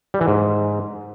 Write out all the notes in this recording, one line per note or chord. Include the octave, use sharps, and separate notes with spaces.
G3
E3
G#2